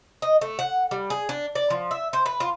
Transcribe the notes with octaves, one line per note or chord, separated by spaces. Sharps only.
D#5
A3
F#5
G3
G#4
D4
D5
F3
E5
C5
B4
F4